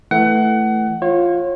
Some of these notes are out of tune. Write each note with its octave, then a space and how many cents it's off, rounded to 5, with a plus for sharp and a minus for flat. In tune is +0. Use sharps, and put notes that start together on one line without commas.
E3 +0 A3 +0 F#5 +25
F4 +0 C#5 -30